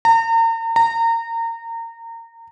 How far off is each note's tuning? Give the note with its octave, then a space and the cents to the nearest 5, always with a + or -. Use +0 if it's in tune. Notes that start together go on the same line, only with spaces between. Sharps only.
A#5 -40
A#5 -30